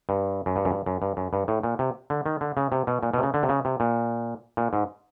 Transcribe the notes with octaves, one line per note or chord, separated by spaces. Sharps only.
G2
F#2
G2
F#2
G2
F#2
G2
F#2
G2
A2
A#2
C3
D3
D#3
D3
C#3
C3
B2
A#2
B2
C3
C#3
D3
C3
C#3
C3
A#2
A#2
G#2